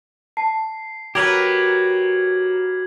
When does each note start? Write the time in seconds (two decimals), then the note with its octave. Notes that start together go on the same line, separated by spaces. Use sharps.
0.37 A5 C7
1.15 F#3 G4 A#4 B4 G#6 F#7